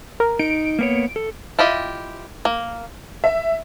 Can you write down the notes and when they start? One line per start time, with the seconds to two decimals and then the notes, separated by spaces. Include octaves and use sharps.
0.20 A#4
0.39 D#4 D7
0.79 A#3 B3 C#5
1.16 A4
1.59 E4 F4 G4 D#5
2.45 A#3
3.24 E5